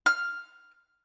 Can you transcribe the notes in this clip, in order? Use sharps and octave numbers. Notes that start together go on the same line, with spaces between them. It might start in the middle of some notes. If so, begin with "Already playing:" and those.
F6